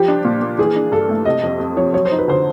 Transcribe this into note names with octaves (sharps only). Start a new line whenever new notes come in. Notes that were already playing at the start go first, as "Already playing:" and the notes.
Already playing: F3 G3 G4
D4
A#2
A#3
E3 G#4
D4
G2 A4
A3
C3 D#5
F2
F2
F3 C#5
F#3 C#5
C5
D#4
B4
D3 C5